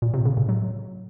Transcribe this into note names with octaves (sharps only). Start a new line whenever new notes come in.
A#2
C3
C#3
A2
F#3